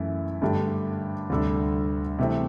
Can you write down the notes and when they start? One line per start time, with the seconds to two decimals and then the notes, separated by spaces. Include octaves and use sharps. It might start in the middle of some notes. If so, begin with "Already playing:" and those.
Already playing: F#2 E3 A3 E4
0.42 G2 D3 A3 D4 G4
1.30 D2 C3 G3 D4 A4
2.19 C3 E3 A3 C4